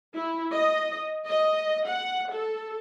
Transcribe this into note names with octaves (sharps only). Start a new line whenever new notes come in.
E4
D#5
D#5
F#5
A4